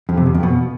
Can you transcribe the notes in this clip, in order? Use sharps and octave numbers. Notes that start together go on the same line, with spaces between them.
F2
C3
E2
F2
B2